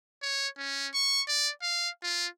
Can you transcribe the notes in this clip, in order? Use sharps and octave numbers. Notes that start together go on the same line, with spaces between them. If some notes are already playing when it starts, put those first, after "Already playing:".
C#5
C#4
C#6
D5
F5
F4